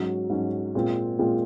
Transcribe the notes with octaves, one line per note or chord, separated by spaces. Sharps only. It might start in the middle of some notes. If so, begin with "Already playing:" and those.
Already playing: G#2 F#3 C#4
G#2 F#3 C#4
A#2 G#3 C4 F4
A#2 G#3 C4 F4